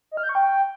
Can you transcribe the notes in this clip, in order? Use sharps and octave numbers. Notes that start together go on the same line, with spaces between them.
D#5
F6
G6
C#6
G5